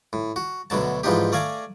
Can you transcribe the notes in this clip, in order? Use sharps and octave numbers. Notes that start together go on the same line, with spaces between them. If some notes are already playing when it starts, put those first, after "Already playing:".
A2
F#4
D2 B2 D3 F#3 A5
G#2 E3 F3 D4 D#4 G4
A3 D5 F5 G#5 A#5 D6